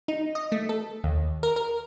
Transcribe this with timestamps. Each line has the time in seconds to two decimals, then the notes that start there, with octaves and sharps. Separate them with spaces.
0.08 D#4
0.35 D#5
0.52 A3
0.69 A4
1.04 D#2
1.43 A#4
1.56 A#4